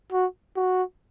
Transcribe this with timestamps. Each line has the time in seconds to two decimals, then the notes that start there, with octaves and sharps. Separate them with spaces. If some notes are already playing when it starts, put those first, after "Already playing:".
0.12 F#4
0.57 F#4